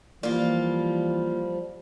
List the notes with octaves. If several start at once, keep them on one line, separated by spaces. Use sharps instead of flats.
E3 F3 G3 A#3 F4 D5 F5